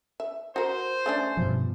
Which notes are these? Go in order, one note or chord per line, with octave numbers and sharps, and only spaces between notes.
E5
F#4 A#4 C5
A3 C#4 D4
G2 B2 F3